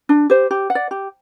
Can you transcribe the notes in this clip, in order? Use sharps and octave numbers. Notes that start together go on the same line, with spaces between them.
D4
G4 C5
G4
F#5
D5
G4